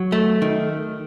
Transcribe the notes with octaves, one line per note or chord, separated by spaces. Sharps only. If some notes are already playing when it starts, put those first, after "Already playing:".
Already playing: F#3
A3
D#3